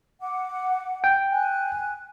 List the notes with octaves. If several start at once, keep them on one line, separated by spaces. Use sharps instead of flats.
F#5 D6
G5
G#5 F#6